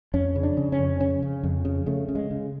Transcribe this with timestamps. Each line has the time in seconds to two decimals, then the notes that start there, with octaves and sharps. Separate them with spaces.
0.14 F2 C#4
0.36 C#3
0.43 D4
0.57 C#3
0.72 C#4
0.79 F2
1.00 C#3 C#4
1.23 C#3
1.43 F2
1.65 C#3
1.86 C#3 A3
2.09 C#3
2.15 G#3
2.31 C#3